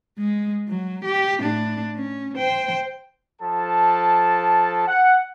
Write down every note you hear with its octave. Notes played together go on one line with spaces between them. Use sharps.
G#3
F#3
G4
A2 D4
C#4
C5 G5
F3 A4 A5
F#5